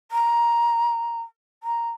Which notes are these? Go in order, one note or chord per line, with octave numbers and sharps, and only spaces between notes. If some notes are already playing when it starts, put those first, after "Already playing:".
A#5
A#5